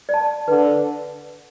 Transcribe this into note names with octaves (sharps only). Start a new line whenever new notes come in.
D5
A5
D3 B4